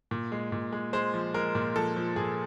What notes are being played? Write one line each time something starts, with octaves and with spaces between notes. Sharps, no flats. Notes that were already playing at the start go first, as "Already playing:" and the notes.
A#2
G#3
A#2
G#3
G#3 C5
F3
G#3 A#4
A#2
F3 A4
F3
A#2 G#4